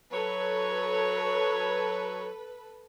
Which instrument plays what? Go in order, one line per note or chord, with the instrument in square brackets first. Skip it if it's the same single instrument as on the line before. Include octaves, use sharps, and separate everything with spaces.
[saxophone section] F#3 C#5 [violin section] A4 B4